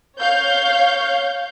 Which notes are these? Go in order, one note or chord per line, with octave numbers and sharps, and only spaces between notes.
C#5 F5 G6